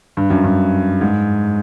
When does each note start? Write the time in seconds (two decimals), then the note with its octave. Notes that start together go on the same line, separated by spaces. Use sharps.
0.17 G2
0.30 F#2
0.44 G2
1.01 G#2